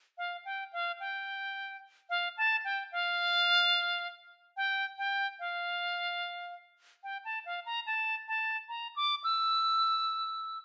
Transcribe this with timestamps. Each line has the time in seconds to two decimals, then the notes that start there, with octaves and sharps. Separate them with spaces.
0.18 F5
0.45 G5
0.73 F5
1.00 G5
2.10 F5
2.37 A5
2.65 G5
2.92 F5
4.57 G5
4.98 G5
5.39 F5
7.03 G5
7.25 A5
7.46 F5
7.66 A#5
7.86 A5
8.28 A5
8.69 A#5
8.96 D6
9.24 E6